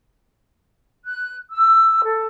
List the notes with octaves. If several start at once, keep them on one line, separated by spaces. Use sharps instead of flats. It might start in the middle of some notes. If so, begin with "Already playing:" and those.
F#6
E6
A4